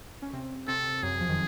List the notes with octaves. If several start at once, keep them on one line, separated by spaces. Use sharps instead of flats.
C#4
C3 C4
C3 C4 A4
F#2 F#3 G#4
F2 F3
D#3